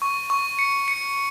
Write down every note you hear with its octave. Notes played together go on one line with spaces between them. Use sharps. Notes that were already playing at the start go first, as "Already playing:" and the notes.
C#6
C#6
C#7
C#7